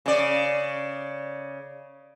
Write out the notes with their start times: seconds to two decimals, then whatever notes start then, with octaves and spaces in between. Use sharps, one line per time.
0.06 C#3 D5